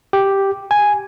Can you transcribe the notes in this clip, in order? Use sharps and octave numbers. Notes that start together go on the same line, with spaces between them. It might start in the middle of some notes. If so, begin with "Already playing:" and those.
G4
G#5